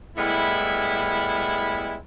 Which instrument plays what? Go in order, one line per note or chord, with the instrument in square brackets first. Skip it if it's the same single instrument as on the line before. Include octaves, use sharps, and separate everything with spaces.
[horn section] A2 G3 G#3 B3 E4